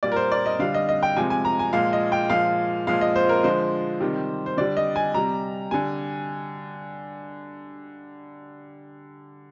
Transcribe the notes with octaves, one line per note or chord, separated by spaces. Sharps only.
A#2 G3 D5
A#4
C5
D5
D#5
D3 G3 F5
D#5
D#5
G5
C3 F3 G#3 G#5
G#5
A#5
G#5
A#2 F3 G#3 F5
D#5
G5
A#2 F3 G#3 F5
A#2 F3 G#3 F5
D#5
C5
A#4
D3 F3 G#3 C5
C3 D#3 G3
C5
D3 G3 D5
D#5
G#5
C3 G3 A#5
D3 G3 G#5